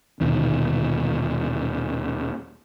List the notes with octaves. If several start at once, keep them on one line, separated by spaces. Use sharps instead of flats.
D#1 D#2 B2 D3